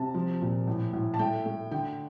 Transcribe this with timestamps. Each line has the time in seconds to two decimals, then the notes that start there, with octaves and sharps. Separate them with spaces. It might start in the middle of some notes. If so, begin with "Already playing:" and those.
Already playing: C3 A5
0.14 F3
0.42 A#2
0.67 A2
0.93 A2
1.14 A5
1.19 A3 G5
1.46 A3
1.71 D3 G5